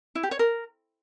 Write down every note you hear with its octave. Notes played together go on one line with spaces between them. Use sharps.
E4
G4
C#5
A#4